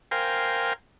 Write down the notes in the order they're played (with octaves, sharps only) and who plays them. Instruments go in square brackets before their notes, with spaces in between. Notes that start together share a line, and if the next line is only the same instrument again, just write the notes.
[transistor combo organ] A#4 C5 F5 G5 G#5